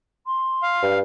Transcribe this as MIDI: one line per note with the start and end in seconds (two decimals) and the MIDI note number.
0.26 0.81 84
0.63 0.98 77
0.82 1.02 43